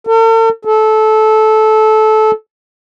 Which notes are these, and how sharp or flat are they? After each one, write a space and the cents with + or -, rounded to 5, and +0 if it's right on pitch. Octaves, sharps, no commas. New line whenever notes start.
A4 +45
A4 -20